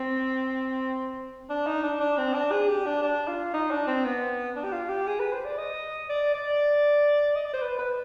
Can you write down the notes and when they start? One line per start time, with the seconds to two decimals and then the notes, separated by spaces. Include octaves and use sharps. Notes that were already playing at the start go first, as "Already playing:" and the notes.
Already playing: C4
1.49 D4
1.67 D#4
1.83 D4
2.00 D4
2.18 C4
2.34 D4
2.52 G#4
2.68 G4
2.86 D4
3.02 D4
3.28 F4
3.53 D#4
3.71 D4
3.87 C4
4.04 B3
4.56 D4
4.64 G4
4.73 F4
4.89 G4
5.07 G#4
5.20 B4
5.33 C5
5.45 D5
5.58 D#5
6.09 D5
6.34 D5
7.35 D#5
7.44 D5
7.53 C5
7.62 B4
7.79 B4